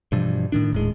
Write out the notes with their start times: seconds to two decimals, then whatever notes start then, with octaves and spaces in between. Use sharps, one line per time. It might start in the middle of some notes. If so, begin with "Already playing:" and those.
0.12 G2 B2 E3 F3
0.52 A2 D#3 D4
0.73 D#1 A2 G#3